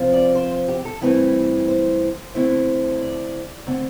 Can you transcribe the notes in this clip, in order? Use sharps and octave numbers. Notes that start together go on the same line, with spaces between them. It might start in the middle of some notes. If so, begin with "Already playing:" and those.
Already playing: C3 F3 C4 F4
D5
C5
G4
A4
G2 E3 A3 C4 E4 B4
C5
D3 A3 C4 E4 C5
D5
D3 A3 C4